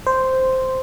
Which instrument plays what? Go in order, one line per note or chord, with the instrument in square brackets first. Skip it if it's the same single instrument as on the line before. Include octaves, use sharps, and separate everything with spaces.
[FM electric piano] C5